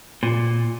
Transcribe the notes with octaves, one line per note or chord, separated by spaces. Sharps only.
A#2